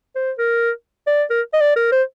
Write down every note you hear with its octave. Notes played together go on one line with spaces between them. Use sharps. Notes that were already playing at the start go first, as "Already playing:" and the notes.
C5
A#4
D5
A#4
D#5
D5
A#4
C5